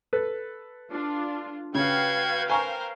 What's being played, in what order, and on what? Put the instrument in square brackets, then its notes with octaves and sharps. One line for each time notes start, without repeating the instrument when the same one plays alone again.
[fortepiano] A4 B4
[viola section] D4 F4
[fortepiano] C#3 [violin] F#4 G#6 [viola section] B4 F5 G5
[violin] A#4 C5 [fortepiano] G#5 A#5 C#6